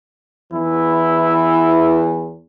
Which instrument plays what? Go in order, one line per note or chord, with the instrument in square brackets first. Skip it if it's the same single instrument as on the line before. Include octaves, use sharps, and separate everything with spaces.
[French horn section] E2 E3 [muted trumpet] E4